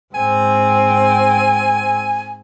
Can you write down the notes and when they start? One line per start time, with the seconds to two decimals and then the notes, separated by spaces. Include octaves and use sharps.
0.14 G#2 C4 G#5